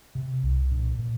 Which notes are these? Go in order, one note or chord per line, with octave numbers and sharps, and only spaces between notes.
C3
C2
A#2
A#2